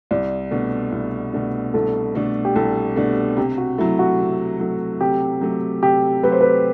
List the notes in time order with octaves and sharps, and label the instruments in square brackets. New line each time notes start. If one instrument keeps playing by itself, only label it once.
[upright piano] C2 [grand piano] D5
[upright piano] B2 A3 D4
C2
B2 A3 D4
[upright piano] C2 [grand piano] A4
[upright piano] B2 A3 D4
[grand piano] G4
[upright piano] C2 [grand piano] A4
[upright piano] B2 A3 D4
[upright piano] C3 [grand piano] G4
[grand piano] F#4
[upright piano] F#3 A3 [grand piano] E4
[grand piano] F#4
[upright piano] C3
F#3 A3
[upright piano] C3 [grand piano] G4
[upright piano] F#3 A3
[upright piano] C3 [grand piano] G4
[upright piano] F#3 A3 [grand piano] B4
[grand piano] C5
B4